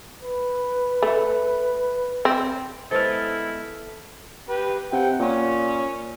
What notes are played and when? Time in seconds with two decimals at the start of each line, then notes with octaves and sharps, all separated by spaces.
0.23 B4
1.02 A3
2.25 C4
2.91 G#3 B3 E4 A4 C5 F6
4.49 G4 B4
4.92 C3 F#5 G5
5.19 A#2 C#4 C#5